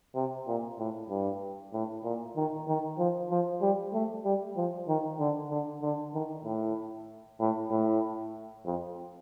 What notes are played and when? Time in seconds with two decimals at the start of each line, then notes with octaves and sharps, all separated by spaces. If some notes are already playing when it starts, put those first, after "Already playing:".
0.15 C3
0.47 A#2
0.79 A2
1.10 G2
1.73 A2
2.04 A#2
2.36 D#3
2.68 D#3
2.98 F3
3.31 F3
3.61 G3
3.93 A3
4.24 G3
4.56 F3
4.88 D#3
5.19 D3
5.50 D3
5.82 D3
6.14 D#3
6.45 A2
7.40 A2
7.71 A2
8.65 F2